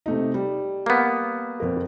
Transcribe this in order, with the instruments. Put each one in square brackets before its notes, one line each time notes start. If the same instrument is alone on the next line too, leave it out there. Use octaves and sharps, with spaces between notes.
[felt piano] C3 A3 D#4
G3
[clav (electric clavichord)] A#3 B3
[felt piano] F2 A#4